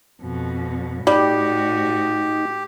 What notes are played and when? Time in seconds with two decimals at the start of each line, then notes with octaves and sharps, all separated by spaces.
0.22 F2 B2
1.07 A2 G3 D#4 F#4 G4